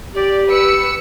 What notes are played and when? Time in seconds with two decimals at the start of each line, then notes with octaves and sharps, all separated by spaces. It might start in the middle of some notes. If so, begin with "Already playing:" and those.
0.15 G4 D5
0.49 B4 E6 C#7